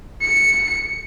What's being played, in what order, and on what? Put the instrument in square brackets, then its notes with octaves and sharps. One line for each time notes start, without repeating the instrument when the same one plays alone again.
[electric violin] C#7